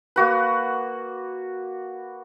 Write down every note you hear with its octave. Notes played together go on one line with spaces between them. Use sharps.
A#3 F#4 B4